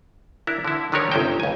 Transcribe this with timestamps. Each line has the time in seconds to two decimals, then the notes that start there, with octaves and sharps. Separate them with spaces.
0.47 D4 E4 A#4
0.65 D3 E4
0.92 D3 D#3 D4 G4 A#4 C#5
1.12 G1 C3 C#4 D#4 C5 G5
1.40 C#2 G#5